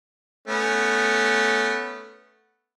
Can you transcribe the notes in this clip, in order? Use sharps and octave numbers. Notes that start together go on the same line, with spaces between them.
A3 B3 C#4